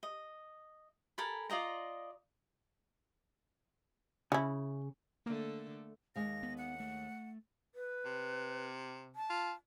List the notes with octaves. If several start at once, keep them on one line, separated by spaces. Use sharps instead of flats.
D#5
A4 A#4 G#5 B5
F4 D5 D#5 A#5
C#3 C#4 E4
D3 A3 A#3
D#2 G#3 F5 A#6
B3
F#5
A3
B4
C3
A5
F4